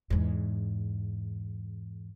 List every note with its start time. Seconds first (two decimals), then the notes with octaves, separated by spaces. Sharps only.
0.10 E2 G#2